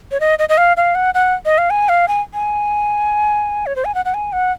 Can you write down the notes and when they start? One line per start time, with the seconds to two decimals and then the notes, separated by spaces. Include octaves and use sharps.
0.12 C#5
0.20 D#5
0.39 D#5
0.49 D#5
0.58 F5
0.77 F5
0.95 F#5
1.14 F#5
1.45 D#5
1.58 F5
1.70 G#5
1.89 F5
2.08 G#5
2.34 G#5
3.66 C#5
3.76 C5
3.85 G#5
3.95 F#5
4.05 F#5
4.14 G#5
4.32 F#5